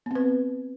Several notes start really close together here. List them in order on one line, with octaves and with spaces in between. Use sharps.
B3 C4 B4